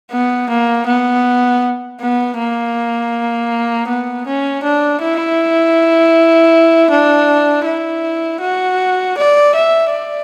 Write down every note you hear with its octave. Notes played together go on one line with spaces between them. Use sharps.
B3
A#3
B3
B3
A#3
B3
C#4
D4
E4
D4
E4
F#4
D5
E5
D5